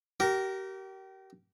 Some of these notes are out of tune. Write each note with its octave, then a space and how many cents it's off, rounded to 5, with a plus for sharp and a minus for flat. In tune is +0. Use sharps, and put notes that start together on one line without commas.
G4 -35 A#4 +0